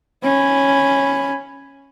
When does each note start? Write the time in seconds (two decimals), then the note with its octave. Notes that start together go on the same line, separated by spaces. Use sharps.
0.23 C#4 B5